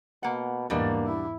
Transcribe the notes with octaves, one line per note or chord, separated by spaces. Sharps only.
B2 A#3 F#5
E2 G#2 B2 G3 A#3 D4
E4